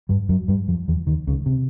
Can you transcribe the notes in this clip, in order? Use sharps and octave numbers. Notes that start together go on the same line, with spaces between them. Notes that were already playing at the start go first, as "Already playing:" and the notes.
G2 G3
F#2 F#3
G2 G3
F2 F3
E2 E3
D#2 D#3
C#2 C#3
C3